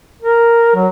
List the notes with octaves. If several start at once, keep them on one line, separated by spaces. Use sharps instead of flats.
A#4
F#3